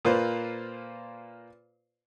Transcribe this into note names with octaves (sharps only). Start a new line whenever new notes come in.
A#2 A#3 F4 B4 C5